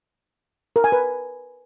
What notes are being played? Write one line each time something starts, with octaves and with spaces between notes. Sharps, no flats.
A#4
G#5
B4